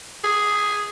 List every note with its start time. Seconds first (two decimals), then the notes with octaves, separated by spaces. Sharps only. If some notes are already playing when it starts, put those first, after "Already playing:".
0.24 G#4